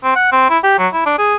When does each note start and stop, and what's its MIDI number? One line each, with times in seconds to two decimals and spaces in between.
0.04 0.15 60
0.16 0.29 78
0.32 0.47 60
0.50 0.58 64
0.64 0.74 67
0.78 0.88 54
0.93 1.03 64
1.06 1.14 62
1.18 1.36 68